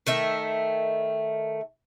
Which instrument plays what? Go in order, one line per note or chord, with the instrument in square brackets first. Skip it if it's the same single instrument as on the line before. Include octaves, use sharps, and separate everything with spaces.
[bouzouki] D#3 A3 E5